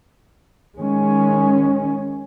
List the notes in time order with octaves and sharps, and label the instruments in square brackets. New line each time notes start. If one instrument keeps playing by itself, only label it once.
[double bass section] D#3 G#3 C#4